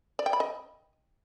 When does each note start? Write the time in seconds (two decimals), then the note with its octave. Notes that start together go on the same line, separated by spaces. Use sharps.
0.19 D5
0.26 G5
0.33 B5
0.40 D#5